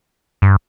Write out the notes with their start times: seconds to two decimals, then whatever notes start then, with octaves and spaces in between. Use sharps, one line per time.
0.42 G2